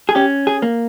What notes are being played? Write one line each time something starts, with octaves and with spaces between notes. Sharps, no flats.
G#4
C#4 G4
G#4
A#3